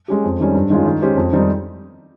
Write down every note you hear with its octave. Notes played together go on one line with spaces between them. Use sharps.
G#3 C#4 G4
F2
D#3 G3 C#4
G2
D#3 G#3 C#4 F4
D#3
G#3 C#4 G4 C5
F2
D#3 G3 C4 D#4